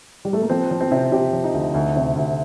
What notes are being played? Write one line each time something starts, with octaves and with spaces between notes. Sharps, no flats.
G3
A3
A#3
F3 C4
F3
C4
C3
C3 G4
F3
D#4
D2
D2
C3
D2